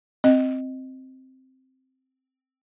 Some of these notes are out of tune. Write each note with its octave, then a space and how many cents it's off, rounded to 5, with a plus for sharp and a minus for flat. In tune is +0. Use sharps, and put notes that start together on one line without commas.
C4 +0 D#5 +0